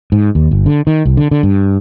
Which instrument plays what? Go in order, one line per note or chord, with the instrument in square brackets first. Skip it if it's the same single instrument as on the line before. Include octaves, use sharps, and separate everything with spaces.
[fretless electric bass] G#2
D#2
G1
D3
D#3
C2
D3
D3
G2